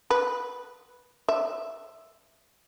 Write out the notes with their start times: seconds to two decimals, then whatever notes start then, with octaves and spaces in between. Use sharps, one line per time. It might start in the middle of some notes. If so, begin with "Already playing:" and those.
0.10 B4
1.29 E5